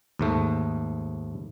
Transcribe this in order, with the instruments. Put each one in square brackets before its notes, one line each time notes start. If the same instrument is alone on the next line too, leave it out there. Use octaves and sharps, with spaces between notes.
[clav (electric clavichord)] D#2 G#2 A3